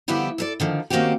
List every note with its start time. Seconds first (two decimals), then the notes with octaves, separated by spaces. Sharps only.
0.08 D3 F3 G3 B3 E4 G4
0.38 A4 A#4 D5
0.60 D3 D#3 F3
0.90 D#3 A#3 C4 C#4 F#4 G4